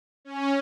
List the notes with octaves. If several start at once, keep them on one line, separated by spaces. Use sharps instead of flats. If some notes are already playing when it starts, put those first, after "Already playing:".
C#4